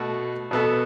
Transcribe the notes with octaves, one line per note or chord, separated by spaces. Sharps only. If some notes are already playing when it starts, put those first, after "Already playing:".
Already playing: B2 A3 F#4
B2 B3 A4